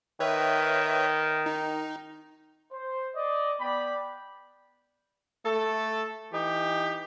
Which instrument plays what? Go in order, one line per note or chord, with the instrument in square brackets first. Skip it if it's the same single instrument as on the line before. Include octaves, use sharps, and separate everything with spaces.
[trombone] D#3 [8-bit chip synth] B4 C#5 E5
[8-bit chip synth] D#4
[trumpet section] C5
D5 D#5
B3 D5 G5 B5
[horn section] A3 A4
E3 D#4 G4